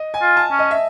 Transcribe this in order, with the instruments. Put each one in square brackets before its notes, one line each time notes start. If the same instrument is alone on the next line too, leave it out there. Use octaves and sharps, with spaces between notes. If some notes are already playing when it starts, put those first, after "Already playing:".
Already playing: [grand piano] D#5
G#5
[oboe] F4
[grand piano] A5
[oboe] C#4
[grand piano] D#5
E5